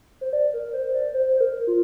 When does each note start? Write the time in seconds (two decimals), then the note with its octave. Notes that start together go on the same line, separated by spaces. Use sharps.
0.21 C5
0.33 D5
0.54 A#4
0.73 C5
0.94 D5
1.14 C5
1.36 C5
1.41 A#4
1.67 F4